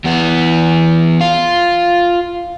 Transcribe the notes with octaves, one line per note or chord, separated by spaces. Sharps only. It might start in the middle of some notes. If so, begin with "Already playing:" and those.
E2 B3
F4